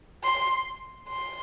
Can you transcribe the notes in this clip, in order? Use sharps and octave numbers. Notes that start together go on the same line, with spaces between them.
C6
C6